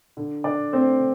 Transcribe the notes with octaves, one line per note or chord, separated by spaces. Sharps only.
D3
D3 D4 D5
A3 C4 C5
D3